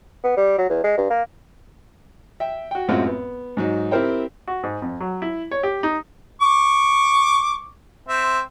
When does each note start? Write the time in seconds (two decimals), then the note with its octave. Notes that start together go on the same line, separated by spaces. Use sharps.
0.24 B3
0.37 G3
0.58 F#3
0.70 E2
0.84 G#3
0.98 G2
1.10 A#3
2.40 E5 G5
2.71 F#4 G5
2.88 F#2 A2 G#3 C4 F4 F#4
3.07 B3
3.57 G#2 F#3 D#4
3.91 C4 E4 G4 A#4 C5 G5
4.48 F#4
4.63 G#2
4.82 F2
5.00 F#3
5.22 E4
5.51 C#5
5.63 G4
5.83 D#4
6.41 C#6 D6
8.09 C4 E5